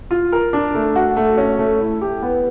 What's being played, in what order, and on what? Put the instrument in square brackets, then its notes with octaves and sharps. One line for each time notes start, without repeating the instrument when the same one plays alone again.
[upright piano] F4
A#4
D4
A3
F#4
A3
C#4
A3
E4
G4
B3